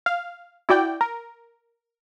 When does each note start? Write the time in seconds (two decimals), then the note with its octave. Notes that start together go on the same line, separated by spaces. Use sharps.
0.06 F5
0.69 E4 F#4 D5 G5
1.01 A#4